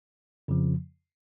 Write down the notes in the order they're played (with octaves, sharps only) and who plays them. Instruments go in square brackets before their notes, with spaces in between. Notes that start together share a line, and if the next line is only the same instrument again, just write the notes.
[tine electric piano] F2 C#3 F3